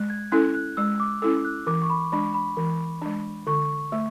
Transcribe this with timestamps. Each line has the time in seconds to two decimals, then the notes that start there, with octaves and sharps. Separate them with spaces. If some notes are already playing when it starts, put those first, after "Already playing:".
Already playing: G#3 F#6
0.10 G#6
0.32 C#4 E4 A4 F#6
0.55 F#6
0.77 G#3 E6
1.00 D6
1.22 C#4 E4 A4 E6
1.45 F#6
1.67 E3 D6
1.82 C#6
1.90 B5
2.12 G#3 D4 B5
2.34 B5
2.57 E3
3.02 G#3 D4
3.47 D3 C#6
3.92 A3